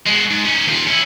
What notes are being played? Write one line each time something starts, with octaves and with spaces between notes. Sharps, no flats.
G#3 F#4
G#2
C#4 D#4
D#2 F4
C#4 E4